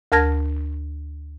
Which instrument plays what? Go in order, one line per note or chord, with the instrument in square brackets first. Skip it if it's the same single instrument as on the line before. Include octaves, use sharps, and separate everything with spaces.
[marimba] D2 A#4 A5 F6 G#6 A#6